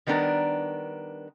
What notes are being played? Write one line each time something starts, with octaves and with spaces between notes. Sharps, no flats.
D#3 G3 B3 D4 A#4